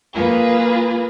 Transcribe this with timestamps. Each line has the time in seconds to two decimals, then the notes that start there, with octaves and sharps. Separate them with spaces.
0.14 A#3 F4 G#4 B4